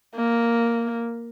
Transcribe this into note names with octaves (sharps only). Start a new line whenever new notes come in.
A#3